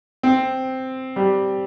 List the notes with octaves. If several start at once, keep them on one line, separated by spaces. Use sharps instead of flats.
C4
G3